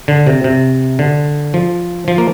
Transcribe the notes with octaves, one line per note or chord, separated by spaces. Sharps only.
D3
C3
C3
D3
F3
F3
A#3